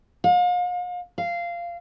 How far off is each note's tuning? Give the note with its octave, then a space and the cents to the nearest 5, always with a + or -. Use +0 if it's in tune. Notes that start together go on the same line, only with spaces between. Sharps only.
F5 +40
F5 -15